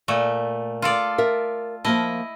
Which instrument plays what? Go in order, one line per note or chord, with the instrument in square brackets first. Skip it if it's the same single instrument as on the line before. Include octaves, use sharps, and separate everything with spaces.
[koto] A#2 A3
F4 A4 D5
[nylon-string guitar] A#4 E5
[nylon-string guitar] F3 A#3 A5 [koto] E4 D#5